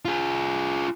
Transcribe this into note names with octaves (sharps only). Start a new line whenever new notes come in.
F4 G#4